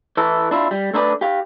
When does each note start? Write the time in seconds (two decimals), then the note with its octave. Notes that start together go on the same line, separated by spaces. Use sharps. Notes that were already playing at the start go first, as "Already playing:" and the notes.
0.17 E3 E4 A4
0.51 D4 E4 F4
0.71 G3
0.94 A3 D4 E4 G4 B4 D5
1.21 G4 F5